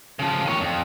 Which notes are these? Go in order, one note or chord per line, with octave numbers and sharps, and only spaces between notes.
C#3 F3
D#3 C#5
F2